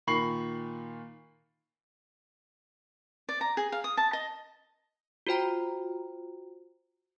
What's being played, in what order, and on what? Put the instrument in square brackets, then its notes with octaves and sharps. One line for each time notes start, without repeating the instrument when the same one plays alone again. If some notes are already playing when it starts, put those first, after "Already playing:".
[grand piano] A#2 D#3 B5 C#6 C7 F#7
[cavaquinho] D5
A#5
G#4
F5
D#6
A5
D#5
[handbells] F4 F#4 C5 G5 A#5